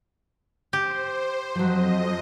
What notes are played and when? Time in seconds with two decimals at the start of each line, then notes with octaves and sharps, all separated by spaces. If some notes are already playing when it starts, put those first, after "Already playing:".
0.73 G4 C5
1.55 F2 F3 F#3 D#5